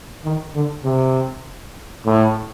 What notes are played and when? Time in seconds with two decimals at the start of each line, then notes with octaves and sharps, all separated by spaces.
0.24 D#3
0.55 D3
0.84 C3
2.06 A2